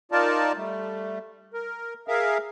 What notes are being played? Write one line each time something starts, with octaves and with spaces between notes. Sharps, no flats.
D#4 F4 A#4 D5 A5
G3 A3
A#4
G#4 A#4 E5 F5